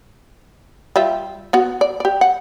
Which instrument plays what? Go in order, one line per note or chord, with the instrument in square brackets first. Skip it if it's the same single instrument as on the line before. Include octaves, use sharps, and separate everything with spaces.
[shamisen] G3 F4 E5
B3 F#4
D5
G4 D5
F#5